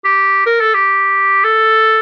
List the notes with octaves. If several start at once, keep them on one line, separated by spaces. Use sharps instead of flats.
G4
A#4
A4
G4
A4